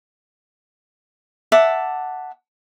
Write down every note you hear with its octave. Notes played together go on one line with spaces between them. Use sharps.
E5 F#5 A5 D6